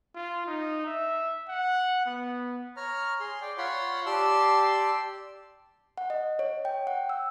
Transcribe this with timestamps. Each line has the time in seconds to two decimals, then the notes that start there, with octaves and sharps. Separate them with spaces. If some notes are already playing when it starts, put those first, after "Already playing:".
0.15 F4
0.46 D#4
0.86 E5
1.48 F#5
2.06 B3
2.77 C#5 A#5 F6
3.20 G#4 C6
3.41 D5 G5
3.58 F4 C#5 F#5 B5 C6
4.06 G4 D5 A5 C6 E6
5.98 F#5
6.10 D#5
6.39 C#5
6.65 G5
6.87 F#5
7.09 E6